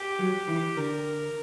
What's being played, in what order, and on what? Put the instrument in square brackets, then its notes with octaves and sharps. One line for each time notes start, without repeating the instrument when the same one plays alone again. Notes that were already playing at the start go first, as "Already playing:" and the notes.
Already playing: [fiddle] G4
[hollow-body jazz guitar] F#3
E3
[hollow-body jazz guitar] D3 [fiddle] A#4